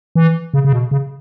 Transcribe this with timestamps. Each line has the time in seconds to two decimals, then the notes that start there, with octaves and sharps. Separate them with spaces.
0.15 E3
0.54 C#3
0.65 C#3
0.73 B2
0.91 C#3